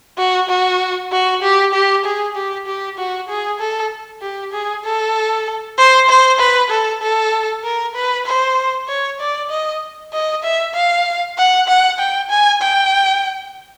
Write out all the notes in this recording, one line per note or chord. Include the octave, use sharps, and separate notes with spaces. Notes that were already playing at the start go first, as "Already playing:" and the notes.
F#4
F#4
F#4
G4
G4
G#4
G4
G4
F#4
G#4
A4
G4
G#4
A4
C5
C5
B4
A4
A4
A#4
B4
C5
C#5
D5
D#5
D#5
E5
F5
F#5
F#5
G5
G#5
G5